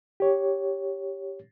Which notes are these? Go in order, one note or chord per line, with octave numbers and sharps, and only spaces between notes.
G4 C#5